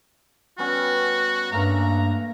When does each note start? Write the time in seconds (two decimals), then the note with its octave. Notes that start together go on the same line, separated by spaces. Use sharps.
0.58 G3 B3 C#4 F#4
1.52 G2 A3 A#3 C#4 A#5